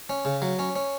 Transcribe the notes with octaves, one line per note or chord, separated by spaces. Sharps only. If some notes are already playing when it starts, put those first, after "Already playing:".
C#4
C#3
F#3
C#4
C#4